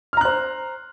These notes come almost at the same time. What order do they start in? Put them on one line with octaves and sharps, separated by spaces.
F6 A#5 F#6 C5